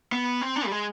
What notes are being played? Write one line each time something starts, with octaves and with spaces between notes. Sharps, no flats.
B3
C4
D4
G3
G#3